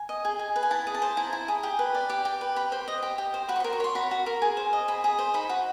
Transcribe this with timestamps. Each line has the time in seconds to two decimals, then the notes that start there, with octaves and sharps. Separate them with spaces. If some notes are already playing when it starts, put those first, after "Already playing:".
Already playing: G#5
0.09 D#5
0.25 G#4
0.39 G#4
0.56 B4
0.63 G#5
0.71 E4 A5
0.87 G#4
0.94 A5
1.02 C5
1.17 E4 A#5
1.33 E4
1.48 G#4
1.63 G4
1.79 B4
1.95 D5
2.10 G4
2.25 G4
2.41 B4
2.56 G4 B5
2.72 C5
2.88 D#5
3.03 G4
3.18 G4
3.34 C5
3.49 F#4 B5
3.56 C#6
3.60 A#4 C6
3.73 C#6
3.80 C#5 C6
3.95 F#4 B5
4.11 F#4
4.26 A#4
4.42 G#4
4.57 C5
4.73 D#5
4.88 G#4 B5
5.04 G#4
5.19 C5
5.34 D#4 B5
5.49 F#4